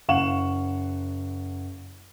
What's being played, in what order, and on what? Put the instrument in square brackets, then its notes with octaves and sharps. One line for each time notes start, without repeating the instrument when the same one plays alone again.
[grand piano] F#1 F5 F#5 C#6 E7 F#7